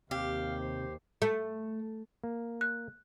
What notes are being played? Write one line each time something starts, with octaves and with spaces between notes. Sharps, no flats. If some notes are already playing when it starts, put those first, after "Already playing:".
D#2 C3 G4 F5
C5
A3
A#3
F#6